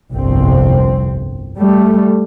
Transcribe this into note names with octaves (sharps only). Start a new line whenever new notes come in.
G1 C2 F2 C4
G3 A3